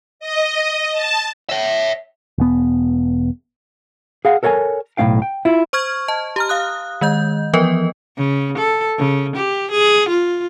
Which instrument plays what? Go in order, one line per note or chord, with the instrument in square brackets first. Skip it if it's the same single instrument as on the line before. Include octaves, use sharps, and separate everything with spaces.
[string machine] D#5
A5
[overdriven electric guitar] C#5 E5
[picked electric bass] E1 B3
[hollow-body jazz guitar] G#4 F5 F#5
A4 A#4 C#5 F5 G#5
B1 A2 A3 C#4 F5 G5
G5
E4 F4
[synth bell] C5 C#6 F6 G#6
D#5 A5
G4 A#5 F6
F5 D#6 F#6
D#3 G#3 D#5 G6
E3 F3 B3 A#4 B4 D#5
[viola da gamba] C#3
A4
C#3
G4
G#4
F4